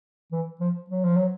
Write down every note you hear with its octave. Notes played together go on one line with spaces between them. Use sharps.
E3
F3
F#3
F3
F#3